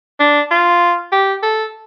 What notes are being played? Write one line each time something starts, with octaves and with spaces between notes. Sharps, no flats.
D4
F4
G4
A4